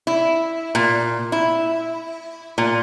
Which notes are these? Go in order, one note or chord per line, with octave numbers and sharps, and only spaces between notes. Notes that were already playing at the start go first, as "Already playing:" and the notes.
E4
A#2
E4
A#2